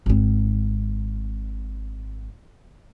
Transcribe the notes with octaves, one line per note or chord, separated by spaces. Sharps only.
G#1 C4